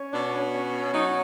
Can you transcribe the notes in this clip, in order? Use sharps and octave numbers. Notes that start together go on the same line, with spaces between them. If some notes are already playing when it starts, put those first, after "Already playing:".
Already playing: C#4
B2 D4
C#4
F#3 D#4